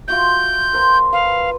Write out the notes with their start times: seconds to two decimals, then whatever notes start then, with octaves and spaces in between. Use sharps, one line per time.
0.08 F4 F#4 E5 G6
0.73 A#4 C5
1.13 B4 F5